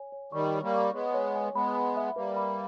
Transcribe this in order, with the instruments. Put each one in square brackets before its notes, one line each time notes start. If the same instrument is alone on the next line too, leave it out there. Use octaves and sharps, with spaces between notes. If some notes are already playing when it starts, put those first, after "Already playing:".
Already playing: [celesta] C#5 G#5
C#5
[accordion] D#3 G3 [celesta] C#6
[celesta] C#5
[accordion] G3 A#3
[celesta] C#6
[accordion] G#3 B3 [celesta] C#5
[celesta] C#5
G#5
[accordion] G#3 B3 [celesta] B5
[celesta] B5
E5
[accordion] G3 A#3 [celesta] B4
[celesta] B5